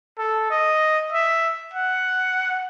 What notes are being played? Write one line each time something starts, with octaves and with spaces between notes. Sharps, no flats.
A4
D#5
E5
F#5